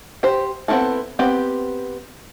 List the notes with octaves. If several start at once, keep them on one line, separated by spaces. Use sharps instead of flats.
G4 C5
B3 C4 E4 F4 A4
B3 C4 G4